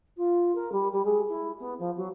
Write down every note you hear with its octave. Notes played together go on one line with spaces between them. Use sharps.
F4
A#4
G3
G3
G#3
E4
B3
F3
F#3